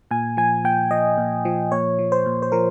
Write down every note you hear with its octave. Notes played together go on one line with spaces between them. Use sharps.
A#2 G#5
F3 G#5
A#2 G5
F3 D#5
A#2
F3
A#2 C#5
F3
C5
A#2
C5
F3 A#4